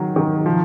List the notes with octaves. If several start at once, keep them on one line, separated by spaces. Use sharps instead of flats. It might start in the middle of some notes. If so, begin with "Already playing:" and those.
Already playing: D#3 F#3
D#3
F3